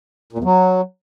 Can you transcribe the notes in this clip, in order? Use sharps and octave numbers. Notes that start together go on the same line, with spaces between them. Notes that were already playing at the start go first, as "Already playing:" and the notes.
A#2
E2
F#3